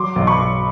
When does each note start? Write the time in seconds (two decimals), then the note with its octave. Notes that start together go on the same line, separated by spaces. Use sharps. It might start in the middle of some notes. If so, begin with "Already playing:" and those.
Already playing: F#3 C6 D6
0.16 B1
0.27 B5 C#6
0.39 B1